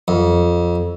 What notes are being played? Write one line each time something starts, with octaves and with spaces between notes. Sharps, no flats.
F2